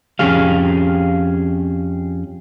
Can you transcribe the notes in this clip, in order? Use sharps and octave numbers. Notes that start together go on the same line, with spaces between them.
F2 C#4 G4 G#4 F5